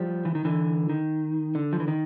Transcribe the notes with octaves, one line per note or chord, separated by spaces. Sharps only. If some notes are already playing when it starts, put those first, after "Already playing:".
Already playing: F3 G3
E3
D#3
D3 E3
D#3
D3
F3
E3
D#3